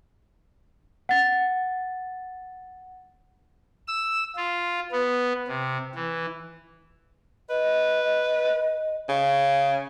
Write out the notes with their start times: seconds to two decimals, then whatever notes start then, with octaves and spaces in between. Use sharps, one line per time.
1.09 F#5 A6
3.87 E6
4.36 F4
4.92 B3
5.47 C3
5.95 E3
7.50 B4 D#5
9.09 C#3